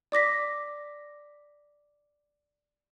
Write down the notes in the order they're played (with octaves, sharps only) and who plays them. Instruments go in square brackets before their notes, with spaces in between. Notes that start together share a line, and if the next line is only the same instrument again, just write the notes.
[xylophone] D5 D6 A#6 B6